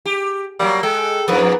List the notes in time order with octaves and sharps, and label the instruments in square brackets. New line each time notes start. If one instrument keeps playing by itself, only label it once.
[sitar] G4
[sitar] F#3 A#3 [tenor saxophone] G3
[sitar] G#3 [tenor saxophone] A4 [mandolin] G5
[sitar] F2 G#2 F3 [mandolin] B3 A#4 B4